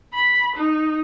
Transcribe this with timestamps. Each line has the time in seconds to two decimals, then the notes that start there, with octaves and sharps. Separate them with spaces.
0.13 B5
0.56 D#4